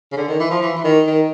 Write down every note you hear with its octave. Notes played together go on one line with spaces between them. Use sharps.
C#3
D3
D#3
E3
F3
E3
E3
D#3
D#3